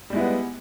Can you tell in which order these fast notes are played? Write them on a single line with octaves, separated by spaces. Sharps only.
G3 G#3 E4 B3